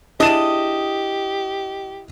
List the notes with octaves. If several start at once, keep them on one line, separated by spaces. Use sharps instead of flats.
D4 E4 G4 G#4 D5 D#5 E7